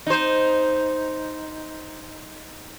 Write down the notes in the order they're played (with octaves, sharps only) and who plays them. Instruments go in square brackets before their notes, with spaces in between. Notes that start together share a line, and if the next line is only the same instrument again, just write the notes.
[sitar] D#4 C5